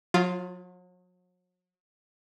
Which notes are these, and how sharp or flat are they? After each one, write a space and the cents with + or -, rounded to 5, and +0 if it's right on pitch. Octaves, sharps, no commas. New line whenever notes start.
F#3 -40 F4 +0